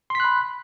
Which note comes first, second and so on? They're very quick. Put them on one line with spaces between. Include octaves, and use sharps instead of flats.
C6 B6 F#6 B5